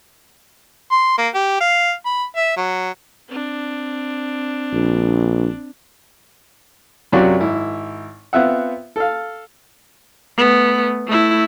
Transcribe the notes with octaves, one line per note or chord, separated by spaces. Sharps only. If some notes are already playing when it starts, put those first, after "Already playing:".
C6
A#3
G4
F5
B5
E5
F#3
C4 D4
A#1
F#2 C3 F#3 F4 F#4 D5
G#1 E4
B3 C4 F4 E5 F#5
A4 F5
A3 B3
A3 E4